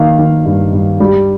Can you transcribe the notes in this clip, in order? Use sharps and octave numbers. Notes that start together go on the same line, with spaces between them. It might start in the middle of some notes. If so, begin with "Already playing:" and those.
Already playing: D#3 A#3 F5
D#3
G2
G2
G3